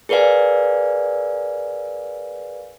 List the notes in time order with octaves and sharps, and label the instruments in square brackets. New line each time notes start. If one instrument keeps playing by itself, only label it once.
[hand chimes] G#4 A#4 B4 D5 F5 G#5